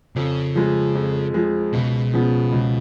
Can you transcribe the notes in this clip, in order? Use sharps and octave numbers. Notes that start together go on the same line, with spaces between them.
F2 C#3
F3 G#3
F2
F3 G#3
C#2 B2
C#3 F3 B3
C#2